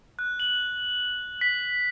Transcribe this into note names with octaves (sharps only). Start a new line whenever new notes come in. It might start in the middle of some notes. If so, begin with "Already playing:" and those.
F#6
F#7
B6